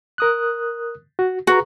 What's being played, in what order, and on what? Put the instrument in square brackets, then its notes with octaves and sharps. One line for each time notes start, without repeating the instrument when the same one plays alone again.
[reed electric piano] A#4 D#6 F#6
F#4
[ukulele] F#4 [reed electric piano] G#4 B4 A#5